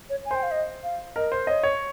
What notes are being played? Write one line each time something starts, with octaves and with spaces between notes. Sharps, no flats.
C#5
G#5
C5 G5
F5
D#5
F5
A#4 D#5
C5
C#5 D#5
C#5